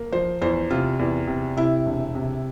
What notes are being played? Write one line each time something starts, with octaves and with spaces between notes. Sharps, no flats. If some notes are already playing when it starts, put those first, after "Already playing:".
Already playing: A#3
F3 C5
E2 C5
C3 F4
E2
C3
C3 E4
E1
C3